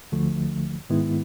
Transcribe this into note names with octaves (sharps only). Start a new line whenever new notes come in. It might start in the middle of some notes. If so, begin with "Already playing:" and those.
D2 D3 F3 A3
G#2 D#3 G#3 B3 E4